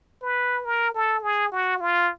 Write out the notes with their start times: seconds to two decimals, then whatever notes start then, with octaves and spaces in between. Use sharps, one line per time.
0.22 B4
0.65 A#4
0.95 A4
1.22 G#4
1.52 F#4
1.80 F4